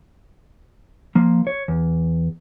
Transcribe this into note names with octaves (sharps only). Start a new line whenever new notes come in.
F3 A#3
C#5
E2